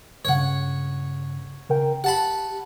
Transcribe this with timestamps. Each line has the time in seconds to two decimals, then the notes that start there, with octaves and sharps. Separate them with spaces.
0.25 C#2 G2 C#3 C#5 F#5
1.69 C#3 A#4 G5
2.04 G4 F#5 A5 B5